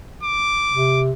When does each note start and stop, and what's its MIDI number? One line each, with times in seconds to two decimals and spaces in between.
0.23 1.02 86
0.73 1.12 48